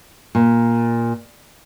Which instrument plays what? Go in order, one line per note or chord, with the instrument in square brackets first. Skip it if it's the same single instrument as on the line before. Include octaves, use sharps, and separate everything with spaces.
[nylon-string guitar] A#2